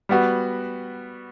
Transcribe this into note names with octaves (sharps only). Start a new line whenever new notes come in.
G3 B3 F#4